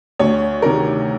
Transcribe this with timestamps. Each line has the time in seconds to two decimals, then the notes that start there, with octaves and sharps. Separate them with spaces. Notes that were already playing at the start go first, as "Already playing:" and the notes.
0.19 D2 C#5
0.62 C3 D#3 A#4